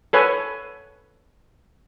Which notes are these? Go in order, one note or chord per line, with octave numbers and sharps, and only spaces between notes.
A4 B4 C#5 G#5